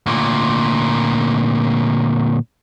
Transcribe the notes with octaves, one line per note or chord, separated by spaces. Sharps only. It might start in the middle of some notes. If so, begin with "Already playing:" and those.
D2 A#2